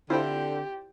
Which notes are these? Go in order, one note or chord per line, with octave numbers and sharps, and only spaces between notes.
D3 C4 E4 F4 G4 C5 D5 G5